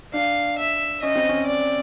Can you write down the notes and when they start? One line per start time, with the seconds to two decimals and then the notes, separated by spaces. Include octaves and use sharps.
0.14 D4 F5
0.58 E5
1.02 C#4 D#5
1.15 C4
1.29 C#4
1.46 D5